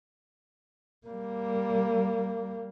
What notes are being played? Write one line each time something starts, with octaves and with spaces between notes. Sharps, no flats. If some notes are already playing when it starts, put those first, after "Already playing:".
G3 A#3